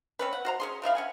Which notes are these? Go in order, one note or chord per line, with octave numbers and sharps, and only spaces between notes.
C4 C#4 B4
F#5
F#4 C5 A#5
C#4 G#4 C6
C#3 F3 E4 F5
C#4 F#5 G#5